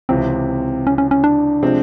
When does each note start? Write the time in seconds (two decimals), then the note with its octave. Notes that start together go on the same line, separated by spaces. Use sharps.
0.09 C#2 C3 E3 C4
0.87 C#4
0.98 C#4
1.11 C#4
1.24 D4
1.62 C3 F3 G#3 C4